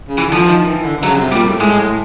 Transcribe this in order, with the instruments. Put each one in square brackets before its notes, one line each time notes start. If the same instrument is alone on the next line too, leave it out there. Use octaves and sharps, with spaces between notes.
[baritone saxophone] C#3
[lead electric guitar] E3
[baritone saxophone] D3
[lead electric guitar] F3
[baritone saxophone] E3
D#3
E3
D3
D3
[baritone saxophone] C#3 [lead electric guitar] F#3
[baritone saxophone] C3
[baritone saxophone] A#2 [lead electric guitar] G3
[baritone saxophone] A2
[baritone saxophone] A2 [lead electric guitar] G#3